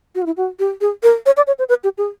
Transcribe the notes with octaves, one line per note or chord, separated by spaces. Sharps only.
F#4
F4
E4
F#4
G4
G#4
A#4
C#5
D5
C#5
C5
B4
G4
G#4